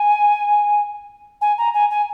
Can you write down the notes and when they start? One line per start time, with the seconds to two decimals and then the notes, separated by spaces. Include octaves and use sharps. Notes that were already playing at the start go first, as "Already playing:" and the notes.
Already playing: G#5
1.41 G#5
1.58 A#5
1.74 G#5
1.90 G#5